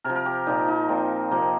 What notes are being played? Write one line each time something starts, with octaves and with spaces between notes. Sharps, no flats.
C3 F3 A#4
A#4
G4
A#2 F3 D#4
D#4
A#2 F3 C4
C3 F3 A#3